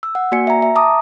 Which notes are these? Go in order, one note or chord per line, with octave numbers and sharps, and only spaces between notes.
E6
F#5
A#3 F#4 D5 G#5 C#7
E5 A#5
E5
A5 A#5 D6 D#6